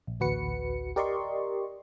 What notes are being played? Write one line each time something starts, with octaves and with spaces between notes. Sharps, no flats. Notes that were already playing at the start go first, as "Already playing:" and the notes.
A#1
A1 D2 F#4 B4 C#7
G4 A#4 D5 D#5 C6 C#6